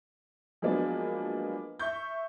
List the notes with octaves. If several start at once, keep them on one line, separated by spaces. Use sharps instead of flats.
F3 F#3 G#3 A#3 B3 D4
E5 C#6 G6